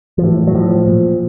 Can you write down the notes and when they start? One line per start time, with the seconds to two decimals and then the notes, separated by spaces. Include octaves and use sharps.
0.18 F3
0.24 A2 E3
0.47 F#3
0.55 A2 F3
0.87 A#2